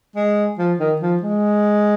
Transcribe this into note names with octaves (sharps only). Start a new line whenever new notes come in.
G#3
F3
D#3
F3
G#3